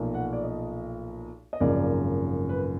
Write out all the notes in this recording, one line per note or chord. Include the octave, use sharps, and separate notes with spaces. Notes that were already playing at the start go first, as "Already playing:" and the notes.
Already playing: B1 A#2 F3 A#3
F#5
D5
D#5
D#5
G#1 F#2 C#3 F3 A#3 D5
B4